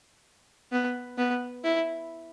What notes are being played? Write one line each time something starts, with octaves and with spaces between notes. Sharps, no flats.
B3
B3
E4